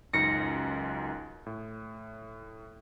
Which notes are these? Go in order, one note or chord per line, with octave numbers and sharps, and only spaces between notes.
C#2 F#2 D#4 A#6 C#7
A2